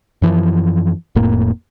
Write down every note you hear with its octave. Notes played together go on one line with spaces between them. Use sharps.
F#2 E3 F3
F1 F2 A2 A#3